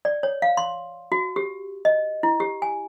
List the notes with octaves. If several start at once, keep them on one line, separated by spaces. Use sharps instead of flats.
D5
C#5
F5
C6
F#4
G4
D#5
E4
G4
G#5